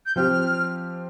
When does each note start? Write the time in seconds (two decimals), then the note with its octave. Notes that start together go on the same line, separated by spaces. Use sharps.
0.06 G6
0.16 F3 C4 G4 F6